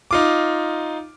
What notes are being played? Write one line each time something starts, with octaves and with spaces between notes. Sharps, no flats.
D#4 F4 D6